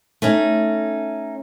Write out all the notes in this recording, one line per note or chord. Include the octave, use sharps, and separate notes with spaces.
A3 C#4 D#4